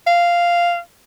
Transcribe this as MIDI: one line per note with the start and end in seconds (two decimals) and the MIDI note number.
0.07 0.79 77